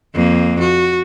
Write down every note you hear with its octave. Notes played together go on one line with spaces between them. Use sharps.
F2 A#3
F#4